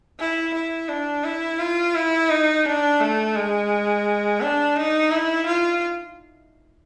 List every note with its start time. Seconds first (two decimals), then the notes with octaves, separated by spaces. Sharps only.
0.19 E4
0.54 E4
0.89 D4
1.24 E4
1.59 F4
1.95 E4
2.30 D#4
2.66 D4
3.00 A3
3.36 G#3
4.41 D4
4.76 D#4
5.11 E4
5.46 F4